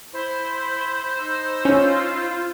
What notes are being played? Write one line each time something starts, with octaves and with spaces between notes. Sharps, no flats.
E4 C5 B5 C6
D#4 B5 E6
C#4 F4